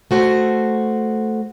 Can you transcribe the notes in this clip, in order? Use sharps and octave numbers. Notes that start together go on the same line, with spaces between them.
A3 F#4 C5